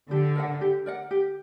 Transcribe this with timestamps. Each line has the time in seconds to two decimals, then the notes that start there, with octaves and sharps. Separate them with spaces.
0.10 D3 G4
0.35 A#4 D5 F#5
0.61 G4
0.86 A#4 D5 F#5
1.11 G4